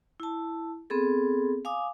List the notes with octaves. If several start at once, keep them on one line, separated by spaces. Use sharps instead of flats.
E4 A5
B3 C4 G#4 A4
F5 G#5 D6 D#6